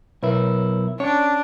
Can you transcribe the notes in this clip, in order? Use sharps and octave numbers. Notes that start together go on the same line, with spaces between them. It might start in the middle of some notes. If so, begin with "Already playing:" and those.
B1 E4 A#4 B4 C#5
C#4 D4 C#5